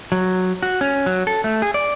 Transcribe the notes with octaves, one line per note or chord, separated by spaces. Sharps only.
F#3
F#4
C#4
F#3
A4
A3
G#4
D5